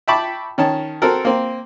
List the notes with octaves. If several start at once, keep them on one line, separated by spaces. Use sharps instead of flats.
E5 G5 A5 B5 C#6 D6
D#3 C#4 A5
C4 F#4 A4 A#4
A#3 C4